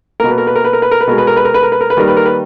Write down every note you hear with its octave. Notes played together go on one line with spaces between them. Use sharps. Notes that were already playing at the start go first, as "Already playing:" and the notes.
B2 A#3 A#4
B4
A#4
B4
A#4
B4
A#4
B4
A#4
B4
B2 G#3 A#4
B4
A#4
B4
A#4
B4
A#4
B4
A#4
B4
D#3 G3 A#3 A#4
B4
A#4
B4